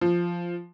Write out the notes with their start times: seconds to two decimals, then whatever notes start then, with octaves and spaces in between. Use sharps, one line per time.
0.01 F3